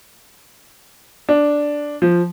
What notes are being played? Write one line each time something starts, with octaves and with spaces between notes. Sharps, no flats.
D4
F3